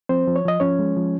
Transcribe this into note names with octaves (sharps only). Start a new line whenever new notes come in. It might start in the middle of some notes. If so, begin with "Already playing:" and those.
F3 C4 C5
F3
C#5
F3 D#5
F3 C#4 C#5
G#3
F3